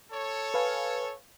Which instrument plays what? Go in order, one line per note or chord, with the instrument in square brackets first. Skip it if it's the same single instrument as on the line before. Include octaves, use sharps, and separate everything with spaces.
[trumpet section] A4 C#5
[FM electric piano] B4 F5 G#5